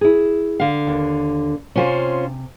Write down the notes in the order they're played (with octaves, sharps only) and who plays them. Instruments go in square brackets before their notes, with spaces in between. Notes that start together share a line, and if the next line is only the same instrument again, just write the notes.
[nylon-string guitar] E4 G#4
[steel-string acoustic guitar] D3 F5
[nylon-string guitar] D#2
[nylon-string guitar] C3 G#5 [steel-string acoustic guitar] C#4 F4 C5